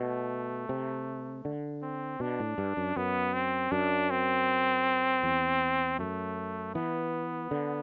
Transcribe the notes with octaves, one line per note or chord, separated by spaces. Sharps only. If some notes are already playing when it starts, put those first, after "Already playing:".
Already playing: B2 A3
C3
D3
C4
B2 D4
A2
G2
F#2
F#2 B3
C4
F#2 D4
C4
E2
F#2 A3
E3 B3
D3